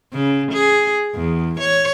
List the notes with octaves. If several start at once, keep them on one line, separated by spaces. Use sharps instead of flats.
C#3
G#4
E2
C#5